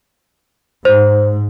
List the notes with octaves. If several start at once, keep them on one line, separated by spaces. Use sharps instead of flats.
G#2 C5